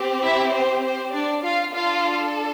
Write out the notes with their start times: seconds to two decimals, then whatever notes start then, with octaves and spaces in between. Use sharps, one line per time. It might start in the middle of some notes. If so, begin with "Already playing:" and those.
Already playing: C4 G4
0.23 E4 E5
0.53 C5
0.83 C5
1.13 D4 D5
1.43 F4 F5
1.73 D4 F4 A4 F5